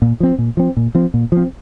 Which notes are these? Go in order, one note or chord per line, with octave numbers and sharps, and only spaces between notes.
A#2
F3 C4
A#2
F3 C4
A#2
F3 C4
A#2
F3 C4